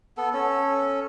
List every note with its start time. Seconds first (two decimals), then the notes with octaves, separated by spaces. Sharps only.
0.17 B3 A4
0.33 C#4 A4